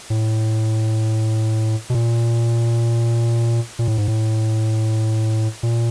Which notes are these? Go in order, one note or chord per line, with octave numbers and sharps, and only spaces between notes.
A2
B2
A#2
A#2
A2
G#2
A2
A#2